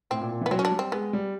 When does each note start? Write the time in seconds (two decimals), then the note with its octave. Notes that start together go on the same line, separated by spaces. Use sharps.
0.11 A2 C4
0.21 A#2
0.31 A#2
0.41 E3
0.46 B3
0.51 F#3 C4
0.59 C#4
0.65 D4
0.71 G3
0.79 C4
0.92 G#3 B3
1.13 G3